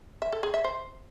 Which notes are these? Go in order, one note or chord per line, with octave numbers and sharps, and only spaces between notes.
E5
A4
G#4
E5
C5